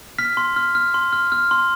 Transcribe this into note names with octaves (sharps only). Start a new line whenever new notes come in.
F6 B6
C6
F6
F6
C6
F6
F6
C6